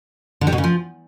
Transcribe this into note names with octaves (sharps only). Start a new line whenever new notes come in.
D3
G3
B2
C#3
F3